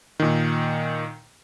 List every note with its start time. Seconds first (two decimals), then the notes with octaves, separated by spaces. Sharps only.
0.20 A#2 D#3